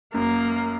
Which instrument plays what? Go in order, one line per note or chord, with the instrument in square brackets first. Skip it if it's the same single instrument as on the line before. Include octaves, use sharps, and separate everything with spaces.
[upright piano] F#2 [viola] A#3